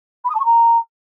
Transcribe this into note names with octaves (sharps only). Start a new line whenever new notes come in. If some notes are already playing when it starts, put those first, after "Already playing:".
B5
D#6
A5
C#6
A#5